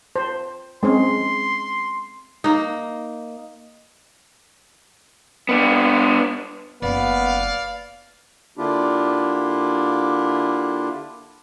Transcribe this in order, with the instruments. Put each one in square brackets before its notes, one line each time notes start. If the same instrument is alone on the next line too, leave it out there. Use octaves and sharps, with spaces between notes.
[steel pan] C5
[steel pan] G#3 C4 C#4 [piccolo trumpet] C6
[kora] A#3 D#4
[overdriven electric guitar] B3 D4
[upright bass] F#1 [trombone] B3 [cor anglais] B4 [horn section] D5 F5
[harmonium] D3 A#3 D4 E4 F4 G4